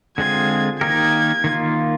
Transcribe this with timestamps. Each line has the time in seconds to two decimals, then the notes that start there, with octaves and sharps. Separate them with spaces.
0.18 D3 G#3 C4 F4 G#4 G#6
0.81 D#3 A#3 D#4 G4 A#4 G#6
1.44 D#3 A#3 F4